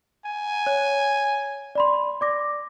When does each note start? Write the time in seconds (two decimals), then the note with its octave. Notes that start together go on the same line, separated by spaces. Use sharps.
0.25 G#5
0.67 C#5
1.75 D5 B5 C6
2.21 D5 D6 A#6